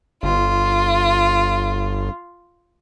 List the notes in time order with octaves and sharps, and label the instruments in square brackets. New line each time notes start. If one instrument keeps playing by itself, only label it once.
[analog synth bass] G1 [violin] F4